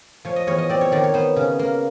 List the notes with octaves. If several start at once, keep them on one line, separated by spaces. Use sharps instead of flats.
F3 C#5
D#5
E2 C#5
D#5
C4 D5
C#5
D#3 D5
C#5
B3 C5
C#3
A#3